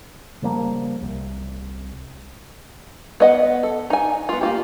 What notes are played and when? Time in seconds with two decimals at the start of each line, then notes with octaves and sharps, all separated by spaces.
0.42 C#3 F3 G3 A#3
1.02 C2
3.20 B3 D#5 F#5
3.63 A4
3.90 D#4 G#5
4.29 B3 F4
4.41 A#3 F4 G4